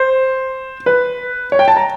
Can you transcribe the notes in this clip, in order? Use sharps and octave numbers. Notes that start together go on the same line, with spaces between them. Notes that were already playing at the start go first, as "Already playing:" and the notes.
Already playing: C5
B4
C#5
G5
A5
A#5